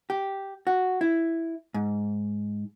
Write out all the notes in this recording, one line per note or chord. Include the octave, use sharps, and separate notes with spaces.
G4
F#4
E4
G#2